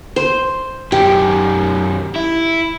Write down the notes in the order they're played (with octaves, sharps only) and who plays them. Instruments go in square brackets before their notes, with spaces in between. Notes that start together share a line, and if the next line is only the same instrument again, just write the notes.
[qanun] C5
[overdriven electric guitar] F#2 D#3 [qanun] G4
[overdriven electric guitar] E4